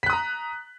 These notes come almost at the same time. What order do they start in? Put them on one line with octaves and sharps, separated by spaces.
B6 F#6 D#6 A#5